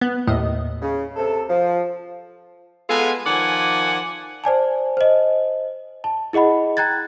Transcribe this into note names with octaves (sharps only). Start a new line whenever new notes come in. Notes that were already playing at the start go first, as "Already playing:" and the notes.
B3
D#2 A2 D#5
C#3
C3 A4
F3
G#3 B3 F4 A4 F#5 G#5
D#3 F3 D5 F#5 G#5
C5 D5 G#5 A5
C5 D#5
A5
E4 G#4 D#5 F#5 B5
G5 A#5 F#6 G#6 A6